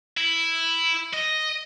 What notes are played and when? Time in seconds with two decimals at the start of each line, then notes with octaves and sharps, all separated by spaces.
0.17 E4
1.13 D#5